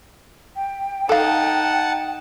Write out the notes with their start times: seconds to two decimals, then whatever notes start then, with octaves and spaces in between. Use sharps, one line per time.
0.56 G5
1.09 D#4 A4 F5 F#5 A5